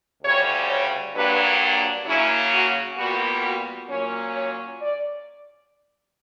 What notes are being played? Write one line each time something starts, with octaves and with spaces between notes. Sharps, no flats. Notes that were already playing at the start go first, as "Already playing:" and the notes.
D2 C#3 G3 C#5
C#5
G2 F#3 A#3 D4 B4
C#3 F#3 A#3 C#4 E4
F#4
A#2 G3 B3 F#4
F#4
A#2 F#3 A#3 C#4 C#5
C#5
D5